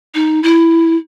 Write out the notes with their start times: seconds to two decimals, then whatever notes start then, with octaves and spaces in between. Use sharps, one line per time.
0.15 D#4
0.43 E4